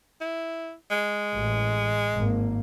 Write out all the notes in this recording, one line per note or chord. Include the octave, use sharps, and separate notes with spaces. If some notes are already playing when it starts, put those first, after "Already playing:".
E4
G#3
A1
G#1 G#2 A#3